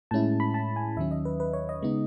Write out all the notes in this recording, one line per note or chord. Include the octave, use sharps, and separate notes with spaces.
A2 G#3 C#4 E4 A5
B5
A5
G#5
D#2 D#3 F#3 C#4 E5
D#5
B4
B4
C#5
D#5
C#3 G#3 B3 D#4